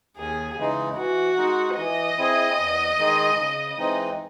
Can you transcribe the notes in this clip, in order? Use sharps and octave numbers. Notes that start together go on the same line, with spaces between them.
D#2 G#4
C#3 E3 G#3 D#4
E3 F#4
G#3 D#4
E3 D#5
C4 E4 G#4
E2
D#3 G#3 D#4 G#4
C#3
E3 G#3 C4 D#4